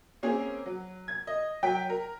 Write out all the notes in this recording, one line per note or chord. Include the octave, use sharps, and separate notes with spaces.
A#3 C4 C#4 G#4
F#3
G#6
D#5
F#3 G5 B6
A#4